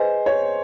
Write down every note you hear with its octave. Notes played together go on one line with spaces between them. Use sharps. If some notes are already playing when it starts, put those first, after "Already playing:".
Already playing: G#4 B4 C5 D#5 G#5
C#5